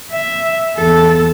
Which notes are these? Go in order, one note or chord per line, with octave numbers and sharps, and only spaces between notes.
E5
E2 A4